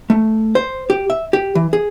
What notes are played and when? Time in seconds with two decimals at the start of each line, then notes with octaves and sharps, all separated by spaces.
0.10 A3
0.55 C5
0.90 G4
1.10 E5
1.33 G4
1.55 E3
1.73 G#4